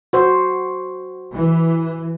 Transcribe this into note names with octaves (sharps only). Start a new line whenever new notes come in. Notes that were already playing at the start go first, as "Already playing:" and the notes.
F#4 C5
E3